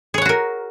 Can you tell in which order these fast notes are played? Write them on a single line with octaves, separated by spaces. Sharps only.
G#4 C#5 F#5 F#4 A#4